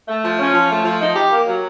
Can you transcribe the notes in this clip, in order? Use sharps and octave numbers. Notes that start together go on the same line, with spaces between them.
A3
F3
C#4
F3
A3
F3
D#4
G4
A#3
F#3